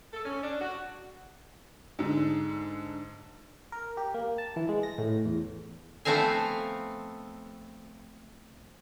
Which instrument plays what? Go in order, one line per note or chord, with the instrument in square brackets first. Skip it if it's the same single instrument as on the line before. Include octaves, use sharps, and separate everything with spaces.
[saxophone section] A4
C#4
D4
F#4
[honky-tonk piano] G#2 D3
[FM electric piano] A#4
G4
A#3
A5
E3
G#3
A#6
A2
E2
[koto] F3 A3 B3 C4 F5 G#5